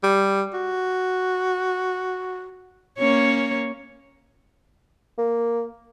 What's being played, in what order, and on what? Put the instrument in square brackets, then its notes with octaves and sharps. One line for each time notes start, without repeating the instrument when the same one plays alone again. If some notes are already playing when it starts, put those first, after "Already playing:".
[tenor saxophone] G3
F#4
[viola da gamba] A#3 C#4 C#5
[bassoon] A#3